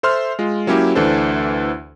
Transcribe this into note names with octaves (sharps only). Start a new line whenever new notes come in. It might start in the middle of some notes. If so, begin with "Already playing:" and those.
A4 C5 E5 C6 F6
G#3 F4
F#3 A#3 C#4 E4 G4
D2 E3 D4 A4 C5